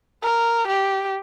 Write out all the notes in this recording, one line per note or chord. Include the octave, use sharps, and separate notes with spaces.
A#4
G4